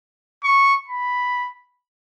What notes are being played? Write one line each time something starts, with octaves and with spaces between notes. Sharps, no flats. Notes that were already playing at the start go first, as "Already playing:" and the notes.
C#6
B5